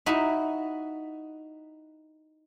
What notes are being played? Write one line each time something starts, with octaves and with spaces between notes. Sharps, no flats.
D#4 E4 F#4 E5